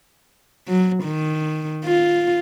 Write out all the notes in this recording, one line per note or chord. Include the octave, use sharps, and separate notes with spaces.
F#3
D#3
F4